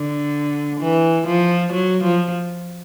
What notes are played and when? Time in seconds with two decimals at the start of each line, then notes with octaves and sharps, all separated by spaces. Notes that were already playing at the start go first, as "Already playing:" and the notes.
Already playing: D3
0.80 E3
1.27 F3
1.73 F#3
2.04 F3